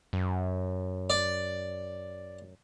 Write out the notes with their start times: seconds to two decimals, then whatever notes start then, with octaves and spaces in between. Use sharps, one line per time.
0.13 F#2
1.10 D5